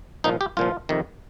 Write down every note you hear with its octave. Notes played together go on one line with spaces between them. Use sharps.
C2 A#2 F3 D#4
G4
C2 A#2 F3 F4
F2 C3 D#3